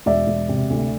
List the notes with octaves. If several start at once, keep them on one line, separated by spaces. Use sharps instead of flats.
E1 D5 E5
E1
C3
D2